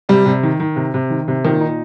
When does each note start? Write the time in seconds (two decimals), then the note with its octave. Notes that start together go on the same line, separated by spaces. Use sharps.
0.09 C3 G3
0.26 C3
0.43 D#3
0.60 D#3
0.76 C3
0.94 C3
1.10 D#3
1.28 C3
1.44 A#2 D#3
1.61 D#4